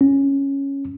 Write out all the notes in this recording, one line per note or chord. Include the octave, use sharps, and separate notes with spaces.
C#4